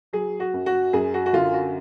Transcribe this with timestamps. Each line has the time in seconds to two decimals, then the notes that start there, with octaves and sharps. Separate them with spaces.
0.13 F#3 G#4
0.40 F#4
0.54 F#2
0.66 F#4
0.93 F#2 G#4
1.14 F#4
1.26 F#4
1.33 D3 F4
1.54 F#4